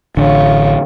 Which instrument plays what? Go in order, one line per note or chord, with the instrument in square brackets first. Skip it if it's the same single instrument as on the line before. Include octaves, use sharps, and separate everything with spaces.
[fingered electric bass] A1 D3 [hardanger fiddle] F4 C#5